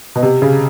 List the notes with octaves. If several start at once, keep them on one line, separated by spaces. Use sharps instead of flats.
B2
C3
C#3